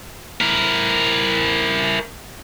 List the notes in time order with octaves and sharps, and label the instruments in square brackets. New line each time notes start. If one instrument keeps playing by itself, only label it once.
[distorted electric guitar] E4 A#4